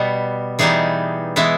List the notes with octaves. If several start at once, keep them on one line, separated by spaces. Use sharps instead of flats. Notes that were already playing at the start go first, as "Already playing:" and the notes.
Already playing: B2 G3 B3
E3 G3 B3 D#4 G#4
E3 G#3 B3 E4